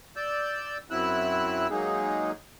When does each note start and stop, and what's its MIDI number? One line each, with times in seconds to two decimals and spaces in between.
0.16 0.78 74
0.16 0.78 88
0.16 0.78 91
0.91 1.67 42
0.91 1.67 54
0.91 1.67 60
0.91 1.67 64
0.91 1.67 88
0.91 1.67 90
1.70 2.31 54
1.70 2.31 56
1.70 2.31 58
1.70 2.31 63
1.70 2.31 68